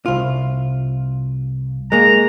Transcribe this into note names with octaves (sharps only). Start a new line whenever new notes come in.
C2 F4
G#3 A#3 A#5